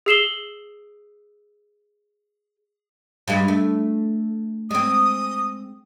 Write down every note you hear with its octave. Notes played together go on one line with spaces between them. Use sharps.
G#4 E6 C7 E7 F#7 G7
G2 G#3
A3
G#3 C4 D#6